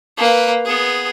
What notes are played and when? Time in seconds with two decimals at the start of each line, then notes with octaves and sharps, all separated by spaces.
0.17 A#3 B4
0.65 B3 G#4